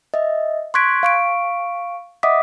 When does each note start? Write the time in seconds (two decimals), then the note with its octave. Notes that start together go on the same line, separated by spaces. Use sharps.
0.14 D#5 E5
0.74 C6 C#6 F#6 G#6 B6 D7
1.03 F5 C#6 D7
2.23 D#5 E5 F#5 D6 D#6 B6